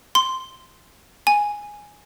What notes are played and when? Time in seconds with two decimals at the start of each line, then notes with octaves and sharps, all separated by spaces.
0.15 C6
1.27 G#5